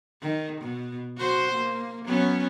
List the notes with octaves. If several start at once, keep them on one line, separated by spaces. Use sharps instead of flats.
D#3
B2
F#4 C5
A#3
F#3 B3 C#4